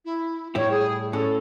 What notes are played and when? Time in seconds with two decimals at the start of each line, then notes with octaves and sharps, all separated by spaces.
0.05 E4
0.55 A2 G3 E4 C#5
0.71 G#4
1.13 A2 C#4 A4